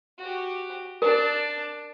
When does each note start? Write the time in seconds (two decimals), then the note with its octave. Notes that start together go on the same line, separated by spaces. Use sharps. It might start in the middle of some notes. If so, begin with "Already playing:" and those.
0.18 F#4 G4
1.02 D4 A#4 A5